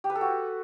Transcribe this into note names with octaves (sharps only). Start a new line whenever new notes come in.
G4
B4
A4
F#4